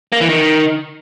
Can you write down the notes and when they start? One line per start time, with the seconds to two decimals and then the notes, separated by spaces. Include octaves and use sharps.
0.12 A#3
0.21 E3
0.29 D#3